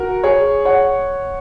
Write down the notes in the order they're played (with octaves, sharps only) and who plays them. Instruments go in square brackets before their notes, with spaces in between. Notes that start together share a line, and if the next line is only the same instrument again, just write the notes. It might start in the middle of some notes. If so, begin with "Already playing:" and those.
Already playing: [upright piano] F#4 A#4
G#4 C#5
C#5 F#5